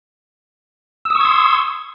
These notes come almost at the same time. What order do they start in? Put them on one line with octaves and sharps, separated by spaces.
E6 D#6 C#6 G#6 C6